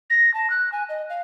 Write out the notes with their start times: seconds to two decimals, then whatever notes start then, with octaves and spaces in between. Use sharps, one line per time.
0.10 A#6
0.34 A5
0.50 F#6
0.72 G#5
0.89 D#5
1.10 F5